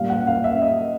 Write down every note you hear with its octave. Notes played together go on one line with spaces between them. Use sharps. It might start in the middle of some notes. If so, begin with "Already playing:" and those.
Already playing: A#2 G3 A#3 F5
F#5
F5
E5
D#5